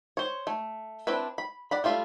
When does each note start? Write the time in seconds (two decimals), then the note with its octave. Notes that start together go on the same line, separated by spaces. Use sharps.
0.17 C5 C#5
0.47 A3
1.07 C4 D4 E4 B4
1.38 B5
1.71 D5 F#5 B5
1.84 G3 A3 F4 E5